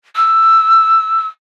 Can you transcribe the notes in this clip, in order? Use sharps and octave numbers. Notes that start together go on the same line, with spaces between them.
E6